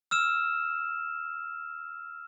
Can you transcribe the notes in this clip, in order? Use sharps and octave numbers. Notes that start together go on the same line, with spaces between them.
E6 F6 E7